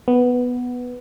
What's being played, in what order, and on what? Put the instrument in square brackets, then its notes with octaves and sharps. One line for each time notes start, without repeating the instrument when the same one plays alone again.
[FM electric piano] B3